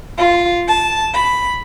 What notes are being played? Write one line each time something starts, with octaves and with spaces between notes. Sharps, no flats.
F4
A5
B5